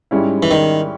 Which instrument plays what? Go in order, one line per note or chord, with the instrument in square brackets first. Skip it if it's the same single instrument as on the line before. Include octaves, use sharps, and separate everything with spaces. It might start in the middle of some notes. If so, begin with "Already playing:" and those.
[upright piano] G#2 G3 C#4 E4
[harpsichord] E3
D#3